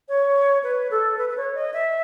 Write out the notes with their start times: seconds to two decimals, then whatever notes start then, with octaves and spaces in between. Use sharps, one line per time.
0.09 C#5
0.63 B4
0.91 A4
1.18 B4
1.29 B4
1.37 C#5
1.54 D#5
1.74 E5